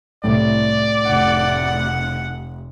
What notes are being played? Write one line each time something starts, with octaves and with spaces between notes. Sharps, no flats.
C2 A2 D5
F1 F#5